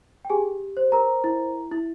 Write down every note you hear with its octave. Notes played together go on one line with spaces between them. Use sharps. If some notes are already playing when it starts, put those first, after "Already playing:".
G5
G4 G#4 G#5
C5
A#4 A#5
E4
E4